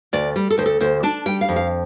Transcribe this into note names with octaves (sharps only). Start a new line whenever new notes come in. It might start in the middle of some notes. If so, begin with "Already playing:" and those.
D2 D5
G3
A4
D2 C5
A4
D2 C5
D4 A5
G3 G5
F5
F2
F5